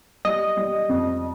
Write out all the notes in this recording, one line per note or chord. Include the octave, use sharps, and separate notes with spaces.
G3 D#5
G3
F2